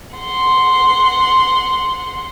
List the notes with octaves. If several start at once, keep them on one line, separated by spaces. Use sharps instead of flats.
F#5 C6